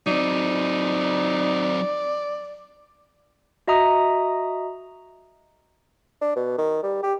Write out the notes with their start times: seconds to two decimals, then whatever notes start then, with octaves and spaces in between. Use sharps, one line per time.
0.07 F#3 C4 D#4 D5
3.68 F#4 D#5 E5 A#5 D#6
6.21 D4
6.36 B2
6.58 D#3
6.83 G3
7.03 G4